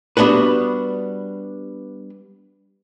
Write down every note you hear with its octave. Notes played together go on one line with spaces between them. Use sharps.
G3 B3 D4 F#4 B4